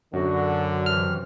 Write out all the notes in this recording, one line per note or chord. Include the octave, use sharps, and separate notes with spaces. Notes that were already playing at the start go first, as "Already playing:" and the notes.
F#2 D3 F#4
C3 D#3 E3 F6